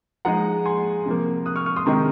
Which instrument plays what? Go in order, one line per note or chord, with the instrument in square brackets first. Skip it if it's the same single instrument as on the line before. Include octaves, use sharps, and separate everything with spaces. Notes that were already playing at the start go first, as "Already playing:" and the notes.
[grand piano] F3 G#3 D#4 F#5 A#5
G#5 C6
C3 F3 A#3
D#6 F#6
C#6 F6
C#6 F6
C6 D#6
C3 D#3 G#3 D#4 A#5 C#6